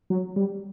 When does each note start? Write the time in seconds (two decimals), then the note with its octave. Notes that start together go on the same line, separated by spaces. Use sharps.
0.10 F#3
0.36 G3